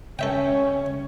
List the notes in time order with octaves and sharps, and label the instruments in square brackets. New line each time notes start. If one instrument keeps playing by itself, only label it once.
[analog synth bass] C#3 [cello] C#4 [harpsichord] A4 E5 G5 [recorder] C#5